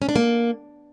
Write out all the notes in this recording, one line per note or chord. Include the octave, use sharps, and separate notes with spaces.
C#4
D4
A#3